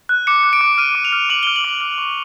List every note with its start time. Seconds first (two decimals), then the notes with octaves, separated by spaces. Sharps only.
0.09 F#6
0.27 D6 C#7
0.44 F#6
0.53 D7
0.61 D6
0.78 F6 D#7
0.95 D6
1.05 F7
1.13 F6
1.30 D6 F#7
1.43 G7
1.47 F6
1.56 F#7
1.64 D6 G7
1.81 F6 F#7
1.98 C#6